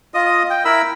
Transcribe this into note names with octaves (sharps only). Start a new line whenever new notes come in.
F4 D#5 D#6
G5
E4 A#4 B5 E6